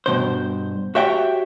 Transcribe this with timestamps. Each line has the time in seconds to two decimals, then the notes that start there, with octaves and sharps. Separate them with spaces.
0.06 G2 B2 C5
0.95 F#4 G4 C#5 E5 F#5 G5